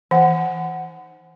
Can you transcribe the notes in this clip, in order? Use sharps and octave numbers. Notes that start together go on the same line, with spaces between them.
E3 D#4 F#5 G#5